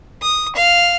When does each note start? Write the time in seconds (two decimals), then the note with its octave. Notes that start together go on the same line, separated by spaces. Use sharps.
0.22 D#6
0.55 F5